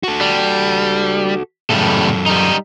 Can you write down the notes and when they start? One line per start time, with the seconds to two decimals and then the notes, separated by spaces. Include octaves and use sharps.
0.03 F#4 A4
0.21 G3
1.70 F#2 A2 C#3 G3 A4
2.26 G3 D#4